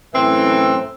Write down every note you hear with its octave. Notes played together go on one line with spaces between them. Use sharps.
F#2 A2 E3 C4